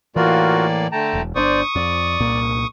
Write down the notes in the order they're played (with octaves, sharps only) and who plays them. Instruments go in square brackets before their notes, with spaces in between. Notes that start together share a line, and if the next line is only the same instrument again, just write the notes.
[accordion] A2 A#3 D5 [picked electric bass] E3 [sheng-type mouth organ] F4 F#4 A#4
[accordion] D3 A3 [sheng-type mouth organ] G5 A5 A#5
[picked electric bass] E1
[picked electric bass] G1 A#2 D4 [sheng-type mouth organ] C5 D5 [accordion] C#6 D#6
[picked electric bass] F2 [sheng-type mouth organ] D5
[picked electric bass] C2 A#2 A#3